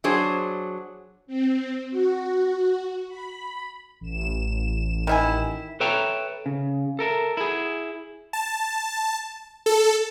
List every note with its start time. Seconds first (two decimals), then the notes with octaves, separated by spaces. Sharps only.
0.04 F#3 D4 G#4 C5
1.27 C4
1.90 F#4
3.09 B5
4.01 A1 E7
5.07 D#3 E4 G#5
5.80 A4 B4 C#5 E5 G5 A#5
6.46 C#3
6.99 A4 A#4 E5
7.37 E4 G#4
8.33 A5
9.66 A4